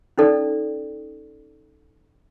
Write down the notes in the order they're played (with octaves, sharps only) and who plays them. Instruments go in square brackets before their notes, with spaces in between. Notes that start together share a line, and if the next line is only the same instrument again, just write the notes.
[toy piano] C#4 D#4 A4 D5